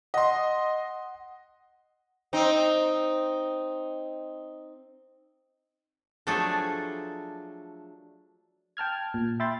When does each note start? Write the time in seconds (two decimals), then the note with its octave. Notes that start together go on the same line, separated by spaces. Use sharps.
0.14 D#5 F#5 C6
2.33 C4 D#4
6.27 F3 F#3 A3 D4 G#4 A4
8.77 G5 A5 F6 G#6
9.14 A#2
9.40 E5 G5 B5 C6 A6